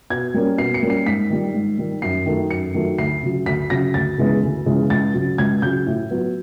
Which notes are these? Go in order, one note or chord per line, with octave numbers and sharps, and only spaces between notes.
B2 G#6
G3 A#3 C#4
B2 C7
C#7
G3 A#3 C#4
C7
G#2 B6
D#3 G3
G#2
D#3 G3
F#2 C7
D#3 F#3 A3
F#2 C#7
D#3 F#3 A3
D2 C7
C#3 F#3
D2 B6
C#3 F#3 A#6
D2 A6
C#3 E3 G#3 B3
D2
C#3 E3 G#3 B3
C#2 A6
C#3 F#3
C#2 G#6
C#3 F#3 G6
A2
F#3 B3